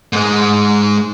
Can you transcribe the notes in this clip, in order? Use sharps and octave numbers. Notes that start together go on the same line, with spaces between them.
G#2 G#3